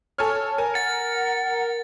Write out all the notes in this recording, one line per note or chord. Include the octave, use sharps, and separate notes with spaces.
A4 C#5 G#5 F6
A#4 G#5
F#5 A6